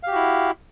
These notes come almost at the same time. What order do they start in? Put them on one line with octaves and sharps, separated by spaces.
F5 G4 F#4 E4